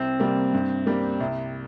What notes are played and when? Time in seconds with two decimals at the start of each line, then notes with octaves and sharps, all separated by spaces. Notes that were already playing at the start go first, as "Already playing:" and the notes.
Already playing: C2 C4
0.19 C3 G3 A#3
0.53 G2
0.86 G3 A#3
1.20 C2